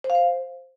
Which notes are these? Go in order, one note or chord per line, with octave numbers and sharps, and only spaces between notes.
C5
F5
C5